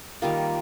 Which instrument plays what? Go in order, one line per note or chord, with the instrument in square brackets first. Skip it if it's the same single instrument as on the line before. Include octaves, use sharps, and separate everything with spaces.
[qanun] D#3 G3 A#3 F4